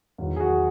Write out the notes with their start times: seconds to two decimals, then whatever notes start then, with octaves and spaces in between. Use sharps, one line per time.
0.18 E2 D#3 F#3
0.36 G#4
0.40 F#4